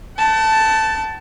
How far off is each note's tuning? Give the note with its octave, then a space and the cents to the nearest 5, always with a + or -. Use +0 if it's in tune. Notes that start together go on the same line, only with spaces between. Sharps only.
F#5 +45 A5 +0